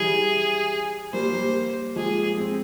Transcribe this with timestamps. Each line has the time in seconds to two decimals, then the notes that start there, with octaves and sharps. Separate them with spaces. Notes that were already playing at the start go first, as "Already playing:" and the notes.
Already playing: E3 G3 G#4
1.13 G3 A#3 C5
1.34 G3 A#3
1.96 F3 G#3 G#4
2.37 G#3 C4